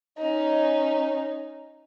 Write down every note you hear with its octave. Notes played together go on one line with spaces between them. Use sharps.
C#4 D#4